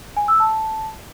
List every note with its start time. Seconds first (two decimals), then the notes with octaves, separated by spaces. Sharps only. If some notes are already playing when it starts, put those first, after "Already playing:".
0.17 G#5
0.28 E6
0.40 A5